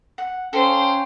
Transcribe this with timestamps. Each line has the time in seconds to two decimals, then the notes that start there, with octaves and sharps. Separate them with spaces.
0.18 F#5
0.53 C#4 A4 C5 F5 G5